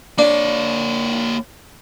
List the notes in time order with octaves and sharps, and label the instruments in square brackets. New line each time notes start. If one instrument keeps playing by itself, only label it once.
[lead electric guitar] A#3 C#5 [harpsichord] D4